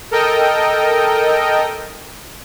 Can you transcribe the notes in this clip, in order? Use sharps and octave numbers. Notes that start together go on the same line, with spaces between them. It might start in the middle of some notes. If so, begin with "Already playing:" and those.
A4 A#4 D#5 G5